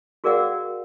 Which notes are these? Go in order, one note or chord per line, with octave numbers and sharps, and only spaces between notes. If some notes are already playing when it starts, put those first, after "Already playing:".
F#4 G#4 A#4 D5 F5 F#5